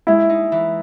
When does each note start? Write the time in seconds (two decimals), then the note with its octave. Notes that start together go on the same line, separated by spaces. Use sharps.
0.07 G#3 E4
0.29 D#4
0.52 E3